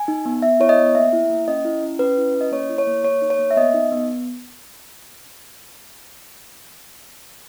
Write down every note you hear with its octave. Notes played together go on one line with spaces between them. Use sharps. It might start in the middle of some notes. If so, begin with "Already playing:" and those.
Already playing: G#5
D#4
B3
B3 E5
E4 C#5
D#5
B3
A#3 E5
E4
A#3
C#4 D#5
E4
C#4
C#4 B4
E4
C#4
D#5
A#3 C#5
E4
C#5
A#3
A#3 C#5
D#4
C#5
A#3
E5
B3 D#5
D#4
B3